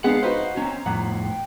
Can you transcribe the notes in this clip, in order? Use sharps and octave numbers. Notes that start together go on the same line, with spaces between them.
G#3 B3 D4 F5 F#5
D#4 F#4 B4 C5
C4 C#4 A#5
F2 A2 F#5
G5